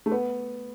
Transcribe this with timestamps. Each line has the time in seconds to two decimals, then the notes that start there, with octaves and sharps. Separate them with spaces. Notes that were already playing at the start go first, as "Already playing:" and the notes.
0.06 A3
0.12 B3